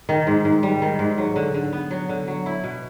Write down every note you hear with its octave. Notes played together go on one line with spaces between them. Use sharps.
D#3
G#2
G#2
G3
D#3
G#2
F#3
D3
D3
B3
F#3
D3
F#3
E4
B2